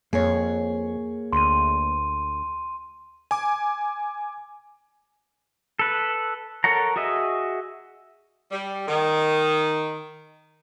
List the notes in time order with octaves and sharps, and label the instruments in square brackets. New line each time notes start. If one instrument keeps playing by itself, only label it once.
[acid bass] F2 [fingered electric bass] A#3 [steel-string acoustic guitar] G#4 C#5
[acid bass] D2 [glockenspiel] C6 D#7
[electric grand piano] G#5 D6
[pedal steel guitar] A4 B4
A4 A#4 C#5 F#5 A#5
F#4 G#4 D#5 E5
[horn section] G3
D#3